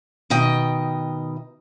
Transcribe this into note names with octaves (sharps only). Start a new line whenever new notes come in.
B2 D#3 D#5 G5